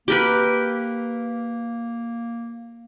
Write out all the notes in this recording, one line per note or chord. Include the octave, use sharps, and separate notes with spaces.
A#3 G4 A#4 B4